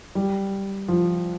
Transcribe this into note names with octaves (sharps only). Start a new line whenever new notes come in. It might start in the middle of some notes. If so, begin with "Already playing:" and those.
G3
F3